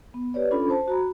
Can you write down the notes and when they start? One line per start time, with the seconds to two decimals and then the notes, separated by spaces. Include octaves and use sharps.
0.14 B3
0.34 G4 B4 C#5 D5
0.51 C#4 D4 F4 A4 B5
0.69 C5 A5
0.88 F#4 A#5 B5